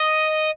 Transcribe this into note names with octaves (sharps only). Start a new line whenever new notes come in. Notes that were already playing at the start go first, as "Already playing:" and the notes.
Already playing: D#5